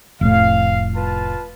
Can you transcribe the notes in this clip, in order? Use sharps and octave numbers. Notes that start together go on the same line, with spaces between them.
F1 A2 F5
F4 B4 A5